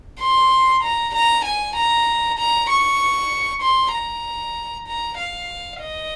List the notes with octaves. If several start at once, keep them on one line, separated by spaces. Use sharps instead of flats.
C6
A#5
A#5
G#5
A#5
A#5
C#6
C6
A#5
A#5
F5
D#5